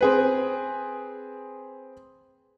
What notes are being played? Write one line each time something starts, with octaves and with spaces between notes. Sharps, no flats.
C4 G#4 B4